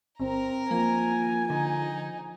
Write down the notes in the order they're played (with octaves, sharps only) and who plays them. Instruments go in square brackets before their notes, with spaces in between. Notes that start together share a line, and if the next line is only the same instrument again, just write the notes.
[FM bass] G1 [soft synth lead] C4 [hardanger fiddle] A#4 A#5
[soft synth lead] F3 [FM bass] A#3 [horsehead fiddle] G#5
[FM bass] D3 [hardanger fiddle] D#4 G#4